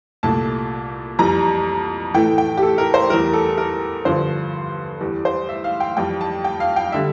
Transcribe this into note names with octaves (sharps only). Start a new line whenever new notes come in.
C2 A#2 A3 A5
F2 E3 G3 A#5
A2 E3 A3 G5
G5
G4
A4
A#4
C5
E2 E3 G3 A#4
A4
A#4
G2 D3 F3 C5
E2 E3 G3
C5
E5
F5
G5
F2 E3 G3 G5
A5
G5
F5
G5
D3 G3 E5